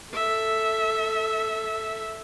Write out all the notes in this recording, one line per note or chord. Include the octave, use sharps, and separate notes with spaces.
A4 E5